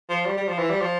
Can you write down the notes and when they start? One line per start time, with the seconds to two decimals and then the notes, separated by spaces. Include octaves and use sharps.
0.09 F3
0.26 G3
0.37 G3
0.48 F3
0.58 E3
0.70 G3
0.81 F3